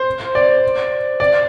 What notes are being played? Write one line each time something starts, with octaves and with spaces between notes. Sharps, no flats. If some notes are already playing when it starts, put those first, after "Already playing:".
Already playing: C5
D5
D5